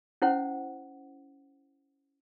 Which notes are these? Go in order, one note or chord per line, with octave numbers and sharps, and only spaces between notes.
C#4 E4 C5 F#5